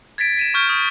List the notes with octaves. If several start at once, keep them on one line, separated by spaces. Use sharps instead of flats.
G#6 A6 B6 D7
B6 D#7 E7
C#6 F6 G6 D7
C#6 D#6